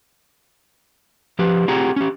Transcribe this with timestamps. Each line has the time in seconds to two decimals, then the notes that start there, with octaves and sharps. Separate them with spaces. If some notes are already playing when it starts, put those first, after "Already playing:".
1.39 F3 G4 B4
1.68 C4 F4 G4 G#4 F#5 A#5
1.96 C#4 G4